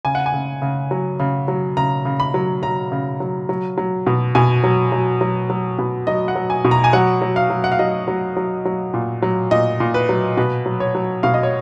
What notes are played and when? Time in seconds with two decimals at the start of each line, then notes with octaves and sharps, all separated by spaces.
0.05 C#3 G#5
0.15 F#5
0.26 G#5
0.34 C#3
0.62 C#3
0.91 F#3
1.20 C#3
1.48 F#3
1.77 C#3 A#5
2.05 C#3
2.20 B5
2.34 F#3
2.63 F#3 A#5
2.92 C#3
3.20 F#3
3.49 F#3
3.78 F#3
4.07 B2
4.35 B2 G#5
4.64 F#3
4.92 F#3
5.21 F#3
5.50 F#3
5.78 B2
6.07 F#3 D#5
6.28 F#5
6.36 F#3
6.50 G#5
6.65 B2
6.71 A#5
6.84 G#5
6.93 F#3 F#5
7.22 F#3
7.36 F5
7.50 F#3
7.64 F#5
7.72 F5
7.79 F#3 D#5
8.08 F#3
8.37 F#3
8.65 F#3
8.94 A#2
9.22 F#3
9.51 A#2 D#5
9.80 A#2
9.94 B4
10.09 F#3
10.37 B2 B4
10.66 F#3
10.80 C#5
10.95 F#3
11.23 B2 F5
11.34 D#5
11.43 C#5